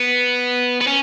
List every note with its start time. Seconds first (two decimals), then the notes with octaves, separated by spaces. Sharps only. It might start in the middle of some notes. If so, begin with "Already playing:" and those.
Already playing: B3
0.81 B3
0.87 C#4